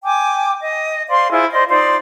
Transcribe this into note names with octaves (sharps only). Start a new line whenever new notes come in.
G5 G#5 D6
D#5
C5 D5 F5 C6
E4 F4 G#4 C5
C5 D5 D#5
D#4 F4 C5 D5